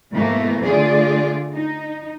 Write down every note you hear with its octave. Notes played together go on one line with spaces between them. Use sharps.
G#2 B2 E3 A3 A#3
D3 A3 F4 G#4 D5
D#4